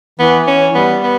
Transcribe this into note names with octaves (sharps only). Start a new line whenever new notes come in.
E3 B3
C#4
G3 B3
B3